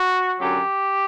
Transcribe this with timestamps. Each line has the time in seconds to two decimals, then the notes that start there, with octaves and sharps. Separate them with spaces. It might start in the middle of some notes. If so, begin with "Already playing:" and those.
Already playing: F#4
0.39 F#2 D3 F#3 G4